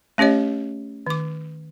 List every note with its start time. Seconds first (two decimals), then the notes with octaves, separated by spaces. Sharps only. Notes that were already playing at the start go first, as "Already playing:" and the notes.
0.18 A3 C#4 G4 C#5 D#5
1.07 D#3 D6